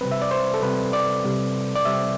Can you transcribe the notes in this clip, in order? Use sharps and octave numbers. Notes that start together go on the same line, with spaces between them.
C3 G3 C4 B4
E5
D5
C5
A4
C3 G3 C4 B4
D5
C3 G3 C4
D5
C3 G3 C4 E5